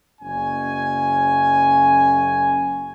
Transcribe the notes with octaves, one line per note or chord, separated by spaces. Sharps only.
F#1 C#4 G#5